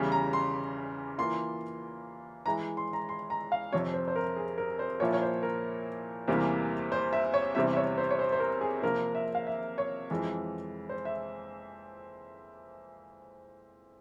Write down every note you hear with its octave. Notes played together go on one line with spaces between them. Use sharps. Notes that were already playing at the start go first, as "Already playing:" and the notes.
Already playing: E2 C#3 E3 G3
A#5
C6
E3 A#3 F4 C6
E3 G#3 E4 A#5
C6
A#5
C6
A#5
F5
F2 C3 F3 C#5
C5
C5
A#4
G#4
A#4
C5
A#2 F3 A#3 E4 C#5
C#5
C5
A#4
E2 C3 E3 G3 A#3
C5
E5
C#5
E2 C3 G3 C4 E5
E5
C#5
C5
C#5
C5
C5
A#4
G#4
C3 F3 A#3 A#4
E5
F5
E5
C#5
F2 E3 G#3
C5
E5